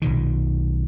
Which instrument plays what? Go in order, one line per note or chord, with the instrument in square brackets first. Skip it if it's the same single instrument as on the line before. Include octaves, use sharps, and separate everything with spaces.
[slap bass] B1 A#2 D#3